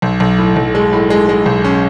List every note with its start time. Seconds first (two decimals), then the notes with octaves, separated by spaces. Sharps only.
0.02 B1
0.20 B1
0.38 A2
0.56 B1
0.75 G#3
0.93 A2
1.10 G#3
1.29 G#3
1.46 B1
1.64 C#4